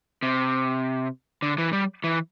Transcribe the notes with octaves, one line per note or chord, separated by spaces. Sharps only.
C3
D3
E3
G3
E3